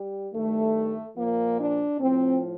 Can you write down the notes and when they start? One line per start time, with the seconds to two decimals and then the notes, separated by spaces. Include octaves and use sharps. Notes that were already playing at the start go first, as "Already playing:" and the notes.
Already playing: G3
0.34 G2 D#3 A3
1.17 A#2 F3 A#3
1.58 D4
1.99 A2 F3 C4